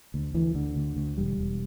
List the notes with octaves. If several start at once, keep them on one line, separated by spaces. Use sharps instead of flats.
D2
D2 E3
D2 D3
D2
D2
E1 G3
E1